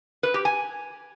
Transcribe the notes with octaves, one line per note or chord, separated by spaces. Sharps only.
B4
G4
G#5